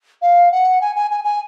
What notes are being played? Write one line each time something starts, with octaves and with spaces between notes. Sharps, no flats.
F5
F#5
G#5
G#5
G#5
G#5